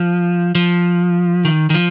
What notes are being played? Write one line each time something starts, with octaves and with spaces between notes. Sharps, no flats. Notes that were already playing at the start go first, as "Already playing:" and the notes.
Already playing: F3
F3
D#3
D#3
F3